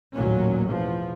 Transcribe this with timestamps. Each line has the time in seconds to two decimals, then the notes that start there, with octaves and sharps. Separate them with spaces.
0.15 A1 D#2 A#2 F#3 A#3 C#4
0.67 E2 B2 F3